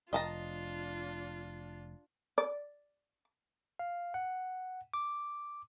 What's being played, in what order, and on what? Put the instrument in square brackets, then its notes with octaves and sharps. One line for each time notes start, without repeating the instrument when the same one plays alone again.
[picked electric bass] F1 [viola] D4 F4 [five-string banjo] D#5 A5 A#5
[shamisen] D5
[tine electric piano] F5
F#5
D6